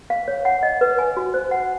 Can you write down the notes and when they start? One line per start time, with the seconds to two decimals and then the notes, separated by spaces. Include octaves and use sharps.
0.10 F5
0.28 C#5
0.45 F#5
0.63 D#5
0.81 B4
0.99 G#5
1.17 F#4
1.34 C5
1.51 F#5